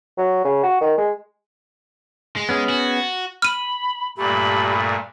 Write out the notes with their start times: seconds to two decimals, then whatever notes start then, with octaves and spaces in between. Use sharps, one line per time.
0.18 F#3
0.44 C#3
0.63 F#4
0.81 D#3
0.98 G#3
2.36 G#3
2.49 B3 C#4 G#4
2.69 F#4
3.42 B5 F6 D#7
4.18 G2 A#2 A3 G4 B5